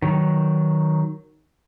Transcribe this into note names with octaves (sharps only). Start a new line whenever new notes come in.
D#3 F#3